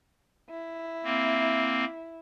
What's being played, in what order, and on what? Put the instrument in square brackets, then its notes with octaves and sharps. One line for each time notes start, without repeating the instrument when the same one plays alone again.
[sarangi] E4
[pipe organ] A#3 C4